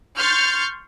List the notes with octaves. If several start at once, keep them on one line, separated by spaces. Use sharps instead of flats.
C6 C#6 F6 G6 A6